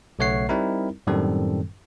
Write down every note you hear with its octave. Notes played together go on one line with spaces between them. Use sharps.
B1 C#3 A3 C#5 F#5 C7
G3 C4 D#4 E4 A#4
F#2 A2 D#3 G3 C4 A4